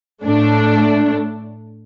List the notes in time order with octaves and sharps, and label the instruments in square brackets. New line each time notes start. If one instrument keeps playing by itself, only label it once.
[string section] A2 A3 D4